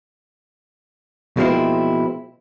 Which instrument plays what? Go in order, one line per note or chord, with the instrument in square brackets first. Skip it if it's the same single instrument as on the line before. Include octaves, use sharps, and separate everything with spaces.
[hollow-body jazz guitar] B2 F3 G#3 A#3 C4 E4